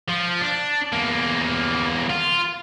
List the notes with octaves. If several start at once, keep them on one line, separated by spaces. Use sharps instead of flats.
F3
D4
E2 A#3
F4